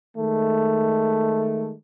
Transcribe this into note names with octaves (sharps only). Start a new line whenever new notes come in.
D#3 G#3 A3